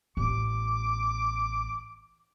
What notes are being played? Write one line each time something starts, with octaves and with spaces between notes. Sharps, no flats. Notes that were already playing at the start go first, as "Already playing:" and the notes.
A1 B3 D6